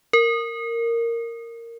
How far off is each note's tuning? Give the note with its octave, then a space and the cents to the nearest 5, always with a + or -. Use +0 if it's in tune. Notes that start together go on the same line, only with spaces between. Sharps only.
A#4 -10